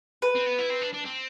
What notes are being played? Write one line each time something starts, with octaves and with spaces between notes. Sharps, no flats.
B4
C4
B3
E4
C4
D4
D4
C4